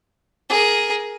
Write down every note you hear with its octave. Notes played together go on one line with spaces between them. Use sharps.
G#4 A#4